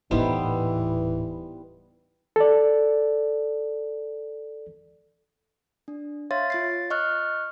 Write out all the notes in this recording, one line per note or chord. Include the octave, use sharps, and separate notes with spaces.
D#1 A2 E3 G3 B3 D#4 E4 C5
A4 D5
D4
C#5 E5 F5 C6 A6
F4 A6 C7
D#5 C#6 F6 F#6